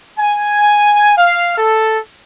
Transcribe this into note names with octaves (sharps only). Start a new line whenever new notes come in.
G#5
F5
A4